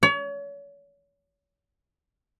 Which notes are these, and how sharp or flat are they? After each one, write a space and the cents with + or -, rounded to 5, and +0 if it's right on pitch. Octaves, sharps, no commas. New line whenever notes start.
C#5 +35